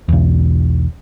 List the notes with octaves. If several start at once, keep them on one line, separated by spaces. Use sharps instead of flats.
B1 E2